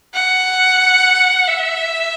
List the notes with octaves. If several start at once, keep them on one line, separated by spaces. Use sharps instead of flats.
F#5
E5